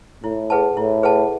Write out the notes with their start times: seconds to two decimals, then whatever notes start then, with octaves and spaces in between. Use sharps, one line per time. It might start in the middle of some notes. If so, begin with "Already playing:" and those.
0.24 A2 E4
0.50 G#4 B4 F#5 A5
0.77 A2 E4
1.03 G#4 B4 F#5 A5